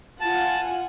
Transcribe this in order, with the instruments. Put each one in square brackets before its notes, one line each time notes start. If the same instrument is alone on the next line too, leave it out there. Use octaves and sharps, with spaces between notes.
[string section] F4 F#5 G#5 [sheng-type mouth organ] A5